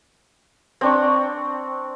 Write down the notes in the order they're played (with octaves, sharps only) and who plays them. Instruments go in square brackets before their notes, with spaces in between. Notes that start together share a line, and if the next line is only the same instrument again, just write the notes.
[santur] C4 D4 C#6